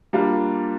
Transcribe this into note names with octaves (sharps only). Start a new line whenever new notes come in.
G3 A#3 D4 F4